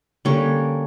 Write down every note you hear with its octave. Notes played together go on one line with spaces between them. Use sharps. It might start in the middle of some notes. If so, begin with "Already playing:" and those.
D3 G3 A#3 C#4 C#5